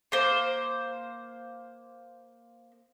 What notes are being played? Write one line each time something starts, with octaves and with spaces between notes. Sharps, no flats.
A#3 C5